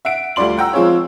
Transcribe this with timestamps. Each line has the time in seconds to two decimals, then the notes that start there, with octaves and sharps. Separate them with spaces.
0.05 E5 F#5 D7
0.36 D2 G3 F4 D5 C6 F#7
0.57 F#5 G5 A#5 E6
0.73 F3 G#3 C4 F4 G#4 C#5